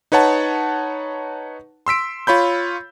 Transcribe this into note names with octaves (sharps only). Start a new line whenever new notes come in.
D#4 B4 C#5 F#5 A5 C#6
C6 E6 B6 D7
F4 C#5 B5 G6